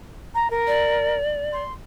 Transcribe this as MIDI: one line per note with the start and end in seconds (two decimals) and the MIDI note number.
0.34 0.50 82
0.50 1.17 70
0.67 1.62 74
1.53 1.73 84